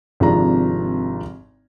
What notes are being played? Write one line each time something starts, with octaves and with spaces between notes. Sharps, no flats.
G#1 C3 F3 D4 A#5